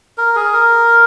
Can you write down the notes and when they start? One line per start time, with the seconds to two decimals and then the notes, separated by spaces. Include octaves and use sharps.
0.18 A#4
0.36 G#4
0.53 A#4